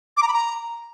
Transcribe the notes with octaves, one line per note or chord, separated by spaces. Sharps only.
D6
A#5
B5
A#5